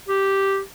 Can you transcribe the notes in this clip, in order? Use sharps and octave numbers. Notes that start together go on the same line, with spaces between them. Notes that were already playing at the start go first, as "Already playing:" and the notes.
G4